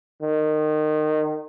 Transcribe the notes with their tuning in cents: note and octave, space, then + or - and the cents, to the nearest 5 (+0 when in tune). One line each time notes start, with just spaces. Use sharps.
D#3 -25